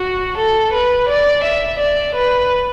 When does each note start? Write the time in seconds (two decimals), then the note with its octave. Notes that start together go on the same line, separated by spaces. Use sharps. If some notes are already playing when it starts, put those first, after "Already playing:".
Already playing: F#4
0.38 A4
0.74 B4
1.09 D5
1.44 E5
1.80 D5
2.15 B4